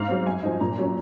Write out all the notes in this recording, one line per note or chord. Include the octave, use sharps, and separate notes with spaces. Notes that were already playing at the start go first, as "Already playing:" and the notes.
Already playing: G#2 F5
F#3 C4
F#2 G#5
F3 C4 D#4
A#2 A#5
F#3 C#4